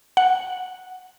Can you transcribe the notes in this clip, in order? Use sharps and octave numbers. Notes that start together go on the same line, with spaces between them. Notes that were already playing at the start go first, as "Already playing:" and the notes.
F#5